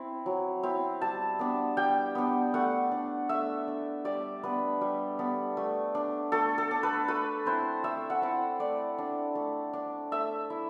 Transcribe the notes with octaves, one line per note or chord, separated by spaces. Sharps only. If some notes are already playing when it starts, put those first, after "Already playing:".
Already playing: C4 E4
F#3
C4 E4
G3 A5
B3 D4
G3 G5
B3 D4
A3 F#5
D4
A3 E5
D4
G3 D5
B3 D4 B4
G3
B3 D4
A3
D4
A3 A4
A4
D4
B4
A3 B4
C4 E4 C5
A3 E5
F#5
C4 E4
A3 D5
D4
A3
D4
A3 E5
E4